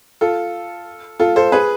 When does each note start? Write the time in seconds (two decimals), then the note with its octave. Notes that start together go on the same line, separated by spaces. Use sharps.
0.21 F4 A4
1.20 F4 A4
1.36 A4 C5
1.52 G#4 B4